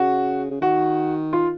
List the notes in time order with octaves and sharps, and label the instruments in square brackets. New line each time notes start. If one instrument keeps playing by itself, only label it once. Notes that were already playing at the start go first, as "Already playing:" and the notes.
Already playing: [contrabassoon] C#3 [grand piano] F#4
[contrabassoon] C#3
[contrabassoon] D#3 [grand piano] F#4
[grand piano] F4